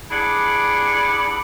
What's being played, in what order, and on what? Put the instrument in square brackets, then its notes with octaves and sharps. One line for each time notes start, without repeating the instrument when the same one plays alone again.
[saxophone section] D4 E4 G4 G#4 D5 F#5